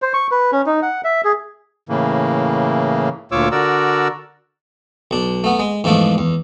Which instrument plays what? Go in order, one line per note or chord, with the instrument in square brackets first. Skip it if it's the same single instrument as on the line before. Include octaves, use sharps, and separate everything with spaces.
[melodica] C5
C#6
B4
C#4
D#4
F#5
E5
G#4
[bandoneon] A2 C#3 E3 A#3
D2 A#2 F4 C#5 D6 E6
D3 F#4 A#4 D5 E6
[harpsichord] B1 D4
A3 B3
G#3
E2 G#2 F3 A3 D4
E2